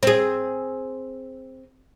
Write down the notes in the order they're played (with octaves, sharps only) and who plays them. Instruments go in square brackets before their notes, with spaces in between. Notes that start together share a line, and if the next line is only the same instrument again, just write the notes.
[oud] C4 G#4